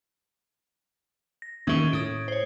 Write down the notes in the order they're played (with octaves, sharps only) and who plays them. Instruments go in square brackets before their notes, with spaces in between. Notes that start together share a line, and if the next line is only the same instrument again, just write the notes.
[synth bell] A#6
[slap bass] D#2 D#3 [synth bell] C#4 E5 C#6
[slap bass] A2 [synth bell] D#6 G#6 D7
[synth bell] C5 C#5